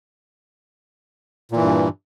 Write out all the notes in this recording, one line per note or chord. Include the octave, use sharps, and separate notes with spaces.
G2 A#2 E3